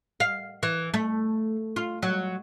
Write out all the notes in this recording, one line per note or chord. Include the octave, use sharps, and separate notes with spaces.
F5
E3
A3
F4
F#3